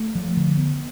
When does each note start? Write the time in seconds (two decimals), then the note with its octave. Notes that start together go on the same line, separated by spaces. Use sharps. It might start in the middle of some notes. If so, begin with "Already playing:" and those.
Already playing: A3
0.15 F3
0.37 D3
0.57 B3